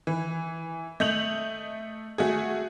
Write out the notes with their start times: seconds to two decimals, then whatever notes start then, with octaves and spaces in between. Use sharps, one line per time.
0.07 E3
1.00 A3 D#5 G6 F7 F#7
2.18 A3 F#4 G#4